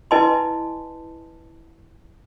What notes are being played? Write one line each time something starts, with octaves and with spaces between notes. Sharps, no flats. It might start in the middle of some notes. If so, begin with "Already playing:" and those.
E4 B4 D#5 G#5 A5 C6